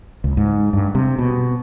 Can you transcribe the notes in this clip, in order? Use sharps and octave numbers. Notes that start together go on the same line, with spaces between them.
C#2
G#2
G2
C3
B2